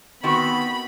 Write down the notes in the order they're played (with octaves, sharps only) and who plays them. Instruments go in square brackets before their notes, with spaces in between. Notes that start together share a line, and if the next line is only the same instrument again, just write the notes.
[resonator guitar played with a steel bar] D#3 C4 F#4 [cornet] B3 [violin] B5